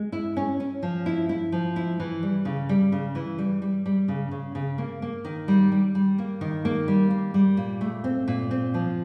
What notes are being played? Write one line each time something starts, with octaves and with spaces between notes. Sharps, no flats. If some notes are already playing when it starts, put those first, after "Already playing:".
Already playing: G#3
E4
C#4
C#4
F3
E4
E4
F3
E4
E3
G3
C#3
G3
C#3
E3
G3
G3
G3
C#3
C#3
C#3
A#3
A#3
D#3
G3
G3
G3
A#3
D#3
A#3
G3
A#3
G3
A#2
A3
C4
A#2
C4
F3